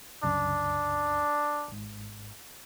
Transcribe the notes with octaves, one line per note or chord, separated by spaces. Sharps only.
C2 F#2 C#3 D4
G#1 G#2